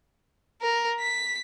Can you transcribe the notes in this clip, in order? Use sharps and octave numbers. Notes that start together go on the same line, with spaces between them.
A#4
B6